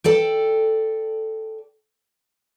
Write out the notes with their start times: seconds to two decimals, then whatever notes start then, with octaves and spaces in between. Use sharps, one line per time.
0.04 A4 D5 G5